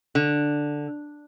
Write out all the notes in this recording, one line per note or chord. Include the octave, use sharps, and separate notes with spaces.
D3